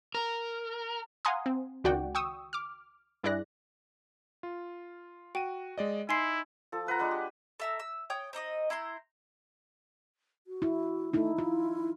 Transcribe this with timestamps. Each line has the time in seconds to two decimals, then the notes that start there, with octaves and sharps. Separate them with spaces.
0.15 A#4
1.25 F5 F#5 G#5 A#5 C6 D#6
1.46 C4
1.84 C#2 D#3 F#4 D5 F#5 G5
2.15 G5 C#6 D#6 E6
2.53 D6 F6
3.24 G2 E4 G#4 D5 F#6 A#6
4.43 F4
5.35 F#4 G5 D#7
5.78 G#3 D5 D#5
6.09 D#4 E4 G#5 C6 C7
6.72 F3 A4
6.87 F4 B4 F#5 A#5
6.99 G#3 D4 B4 F#5
7.11 G4
7.60 A4 E5 A#5
7.80 E6
8.10 C#5 G5 D#6 G6
8.33 C4 D#4 D#5 D#6
8.70 E4 A#5 C6 G6
10.47 F#4
10.62 E4
11.13 A3 D#4 E4
11.38 E4 F4